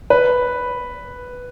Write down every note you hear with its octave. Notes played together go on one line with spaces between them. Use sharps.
B4